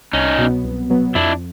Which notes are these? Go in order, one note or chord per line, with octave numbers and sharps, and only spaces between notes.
C2 C#4 D#4
B2 F#3 B3
C2
B2 F#3 B3
F2 D4 E4